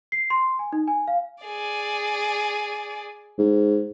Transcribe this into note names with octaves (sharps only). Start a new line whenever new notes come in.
C7
C6
G#5
D#4
G#5
F5
G#4 D5
G#2